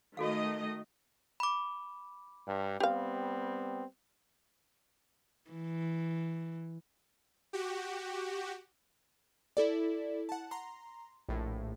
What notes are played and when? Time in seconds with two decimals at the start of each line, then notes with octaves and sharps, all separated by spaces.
0.17 D#3 A3 F#4 A4 D#5 F5
1.40 B5 D6
2.47 G2
2.80 G3 B3 C4 G4 F5
5.51 E3
7.53 F#4 G4
9.57 E4 A4 D5
10.29 F#5 A5
10.51 A#5 C6
11.29 A#1 A2